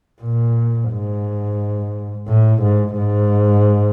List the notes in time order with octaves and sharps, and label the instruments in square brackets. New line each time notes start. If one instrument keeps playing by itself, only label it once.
[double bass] A#2
G#2
A2
G#2
G#2